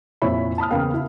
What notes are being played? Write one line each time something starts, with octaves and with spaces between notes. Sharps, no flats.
F2 A#2 E4 C#5 E5 B5
A5 B5 D#6 F6
E2 C#3 A#3 F5 G5
E4